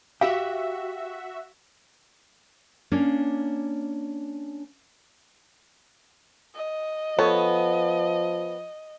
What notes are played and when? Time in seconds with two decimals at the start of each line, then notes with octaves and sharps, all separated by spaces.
0.21 F#4 G4 E5 F5
2.91 A#3 C#4 D4 C#5 F5
6.55 D#5
7.19 F3 B3 A4 C#5